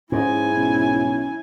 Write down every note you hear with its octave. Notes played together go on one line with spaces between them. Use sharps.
G#2 C#4 E4 G#5
B1 C#4